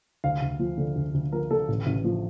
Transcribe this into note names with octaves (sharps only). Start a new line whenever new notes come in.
D2 F5
D2
F3
D3
D2
D2
F3 A#4
D3 A4
A1
A1
F3